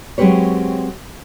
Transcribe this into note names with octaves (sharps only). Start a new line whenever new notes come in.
F#3 G#3 C4 G4 B4 C#5